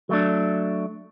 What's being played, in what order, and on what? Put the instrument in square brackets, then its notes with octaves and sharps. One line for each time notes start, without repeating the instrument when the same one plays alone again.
[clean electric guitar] F#3 A3 D4